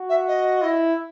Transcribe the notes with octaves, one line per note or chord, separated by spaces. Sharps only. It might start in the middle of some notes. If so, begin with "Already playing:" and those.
Already playing: F#4
E5
D#5
E4